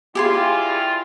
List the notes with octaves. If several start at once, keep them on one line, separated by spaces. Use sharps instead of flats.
G2 E4 F4 G4 G#4 C6